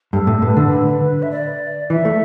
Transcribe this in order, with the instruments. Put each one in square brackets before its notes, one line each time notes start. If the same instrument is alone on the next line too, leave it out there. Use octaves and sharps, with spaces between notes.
[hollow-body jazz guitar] G2 [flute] A4
[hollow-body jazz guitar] A2
[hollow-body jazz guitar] A2 [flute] B4
[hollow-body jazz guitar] D3 [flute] A4
[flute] B4
E5
D5
[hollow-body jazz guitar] E3 [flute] E5
[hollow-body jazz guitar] A3